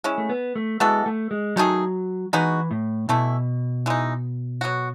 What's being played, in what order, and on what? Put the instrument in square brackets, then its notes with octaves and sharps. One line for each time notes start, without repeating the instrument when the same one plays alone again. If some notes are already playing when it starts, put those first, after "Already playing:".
[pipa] G#3 C#4 E4
[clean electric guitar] A3
B3
A3
[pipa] E3 B3 F#4 A4 [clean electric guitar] G#3
[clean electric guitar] A3
G#3
[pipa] D#3 A3 D#4 G#4 [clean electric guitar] F#3
[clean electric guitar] E3 [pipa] G#3 B3 D#4 F#4
[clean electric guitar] A2
[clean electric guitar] B2 [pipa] E3 A3 E4
[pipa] E3 G#3 D#4
F#3 B3 F#4